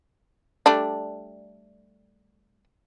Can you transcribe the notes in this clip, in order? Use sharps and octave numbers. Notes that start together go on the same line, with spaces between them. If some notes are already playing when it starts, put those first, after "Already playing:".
G3 A3 D4